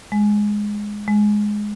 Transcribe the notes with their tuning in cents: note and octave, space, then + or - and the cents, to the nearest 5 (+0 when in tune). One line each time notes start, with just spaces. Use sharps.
G#3 +0
G#3 +5